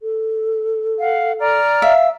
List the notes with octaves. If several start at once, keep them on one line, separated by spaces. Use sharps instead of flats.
A4
F5 F#5
D5 A#5 F6
E5 F5